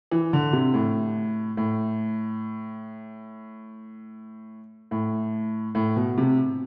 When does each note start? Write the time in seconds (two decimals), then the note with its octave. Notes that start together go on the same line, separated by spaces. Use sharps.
0.11 E3
0.33 D3
0.53 C3
0.74 A2
1.57 A2
4.91 A2
5.75 A2
5.96 B2
6.18 C3